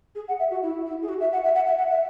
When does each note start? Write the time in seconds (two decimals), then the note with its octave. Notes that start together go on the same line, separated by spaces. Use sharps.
0.15 G#4
0.28 F#5
0.40 E5
0.51 F#4
0.63 E4
0.86 E4
1.03 G#4
1.09 F#4
1.21 E5
1.33 F#5
1.44 E5
1.55 F#5
1.67 E5
1.78 F#5
1.90 E5